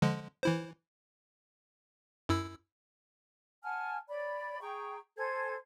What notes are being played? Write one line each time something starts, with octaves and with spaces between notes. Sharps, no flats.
D3 F3 G#3
E3 E4 C5
F#2 E4 E6
F#5 G#5 A5 F6
C#5 D5 B5
G#4 G5 A#5 C#6
A4 C5 G#5 G#6